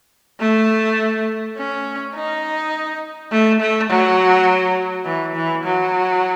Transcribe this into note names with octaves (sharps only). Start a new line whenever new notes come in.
A3
C#4
D#4
A3
A3
F#3
E3
E3
F#3